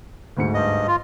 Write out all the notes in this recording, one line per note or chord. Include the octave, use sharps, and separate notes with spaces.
D2 G#2 C#7
G2 D#5
F4